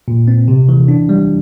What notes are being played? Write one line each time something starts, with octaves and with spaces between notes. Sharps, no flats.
A#2
C4
C3
E3
D4
G3